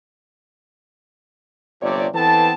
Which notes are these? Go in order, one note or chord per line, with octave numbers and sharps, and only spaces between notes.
G1 C3 F3 C#5 D5
E3 B3 C4 A4 A5